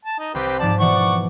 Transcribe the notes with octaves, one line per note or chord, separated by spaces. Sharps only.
A5
D#4
C2 C4 G4 B4
G#2 F3 D5 A5 B5
B2 E3 D5 F#5 C#6